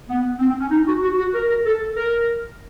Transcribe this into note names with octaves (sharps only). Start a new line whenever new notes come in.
B3
C4
C4
C#4
D#4
F#4
F#4
F#4
A#4
A#4
A4
A#4